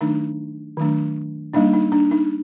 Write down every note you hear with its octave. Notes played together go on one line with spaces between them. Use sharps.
D#3 F#3 A3 D4 D#4
D#3 F#3 A3 D4
G3 A#3 D4 D#4
D#4
D4
D#4